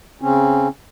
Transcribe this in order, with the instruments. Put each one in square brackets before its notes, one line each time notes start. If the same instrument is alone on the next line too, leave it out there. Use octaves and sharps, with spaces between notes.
[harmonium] C#3 C4 C#4